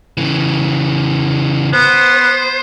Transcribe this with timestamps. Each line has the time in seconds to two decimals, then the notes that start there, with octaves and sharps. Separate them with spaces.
0.17 C#3 E3
1.74 B3 C5